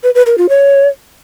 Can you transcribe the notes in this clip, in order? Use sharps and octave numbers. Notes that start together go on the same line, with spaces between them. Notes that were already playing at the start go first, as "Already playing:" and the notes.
B4
B4
A#4
F4
C#5